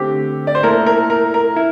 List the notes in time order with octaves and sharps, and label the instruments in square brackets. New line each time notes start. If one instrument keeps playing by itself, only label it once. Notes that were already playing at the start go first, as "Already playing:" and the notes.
Already playing: [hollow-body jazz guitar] D3 A3 C4 [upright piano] G4
[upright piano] D5
C5
[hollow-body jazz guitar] A#2 A3 E4 A4 [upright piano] A#4
[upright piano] A#4
A#4
A#4
[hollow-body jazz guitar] E4